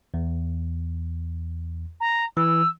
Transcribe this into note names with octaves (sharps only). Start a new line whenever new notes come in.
E2
A#5
E3 E6